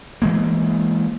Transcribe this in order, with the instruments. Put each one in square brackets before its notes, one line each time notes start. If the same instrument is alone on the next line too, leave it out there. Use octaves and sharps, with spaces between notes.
[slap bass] E3 G#3 A#3